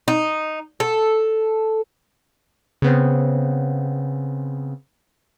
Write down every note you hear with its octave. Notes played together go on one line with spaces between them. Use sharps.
D#4
A4
C#3 B3 C4